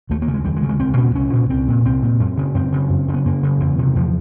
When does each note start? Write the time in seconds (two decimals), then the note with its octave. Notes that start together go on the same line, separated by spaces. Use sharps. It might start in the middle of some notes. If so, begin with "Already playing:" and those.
0.10 D#2 A3
0.22 A#3
0.28 C#3
0.34 G#3
0.45 D#2 G3
0.56 G#3
0.63 C#3
0.69 G#3
0.80 C2 C4
0.97 A#2 C#4
1.15 C2 C#4
1.33 A#2
1.49 C2 C4
1.68 A#2
1.85 C2 C4
2.03 A#2
2.20 F#2
2.37 C#3
2.55 F#2 C4
2.72 C#3
2.90 F#2
3.08 C#3
3.14 B3
3.25 F#2 A#3
3.43 C#3
3.60 E2
3.78 C3
3.95 E2 F3